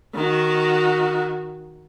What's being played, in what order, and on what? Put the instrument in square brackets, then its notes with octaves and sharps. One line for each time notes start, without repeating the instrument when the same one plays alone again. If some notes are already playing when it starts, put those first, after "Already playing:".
[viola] D#3 F#4